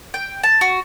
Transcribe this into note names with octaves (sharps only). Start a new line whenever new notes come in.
G5
A5
F#4